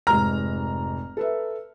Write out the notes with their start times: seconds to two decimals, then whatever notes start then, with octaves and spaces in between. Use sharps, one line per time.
0.07 F1 G#2 A#5 F6
1.17 A4 B4 E5